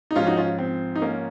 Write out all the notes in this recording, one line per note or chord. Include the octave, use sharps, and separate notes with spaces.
D#4
G#2 F3 C#4 F4
D#4 F#4
C#4 F4
C4
D#4
A#3 C#4